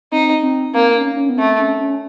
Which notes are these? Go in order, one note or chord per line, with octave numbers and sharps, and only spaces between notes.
C4 D#4
C4
A#3 C4
C#4
C#4
B3
A3 C4
C#4
C#4